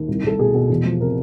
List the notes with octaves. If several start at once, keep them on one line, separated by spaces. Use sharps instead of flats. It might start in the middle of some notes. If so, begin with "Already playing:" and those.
Already playing: D#2
C2
C2 A4
B2 G#4
B2
E2
F3
C3 A#4